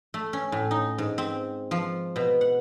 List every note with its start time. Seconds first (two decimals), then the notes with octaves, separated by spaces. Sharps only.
0.14 A3
0.33 C#4
0.52 A2
0.71 D#4
0.98 G#2
1.18 C4
1.71 F3
2.16 B2
2.41 F#5